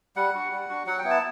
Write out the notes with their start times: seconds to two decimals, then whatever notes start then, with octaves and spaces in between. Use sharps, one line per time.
0.16 G3 F#5
0.34 D4 F#4
0.51 G3
0.69 D4 F#4
0.86 F#3 F#5
0.98 G5
1.04 B3 E4
1.10 A5